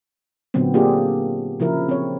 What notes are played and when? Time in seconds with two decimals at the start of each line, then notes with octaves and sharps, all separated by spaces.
0.54 A#2 D3 F#3 B3 C4
0.74 A#3 C4 D4 F4 G4 G#4
1.60 C#3 F3 E4 A#4
1.89 C4 C#5